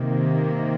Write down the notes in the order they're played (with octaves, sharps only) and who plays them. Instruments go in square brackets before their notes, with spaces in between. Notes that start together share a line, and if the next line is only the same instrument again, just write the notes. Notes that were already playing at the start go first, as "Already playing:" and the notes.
Already playing: [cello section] C3 D#3 A#3